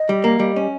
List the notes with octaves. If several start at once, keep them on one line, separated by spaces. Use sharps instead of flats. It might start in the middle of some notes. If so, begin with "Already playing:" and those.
Already playing: D#5
G3
A#3
G3 D#5
C#4